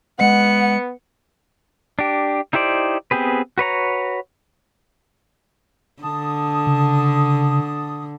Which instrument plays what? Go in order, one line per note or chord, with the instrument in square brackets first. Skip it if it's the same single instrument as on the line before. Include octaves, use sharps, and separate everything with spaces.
[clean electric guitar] G#3 D#5 [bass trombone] B3 [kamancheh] F#5 [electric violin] C#7
[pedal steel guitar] D4 G4
D#4 E4 G4 C5 D5
B3 C4 G4 G#4 B4
F#4 B4 C#5 A#5
[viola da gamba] D3 [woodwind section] A5 D#6
[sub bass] C#3